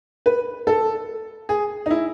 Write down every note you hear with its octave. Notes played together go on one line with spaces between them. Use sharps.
B4
A4
G#4
D#4
E4